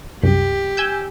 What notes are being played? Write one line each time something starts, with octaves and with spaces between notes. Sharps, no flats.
C2 F#2 G4
G#5 E6 G6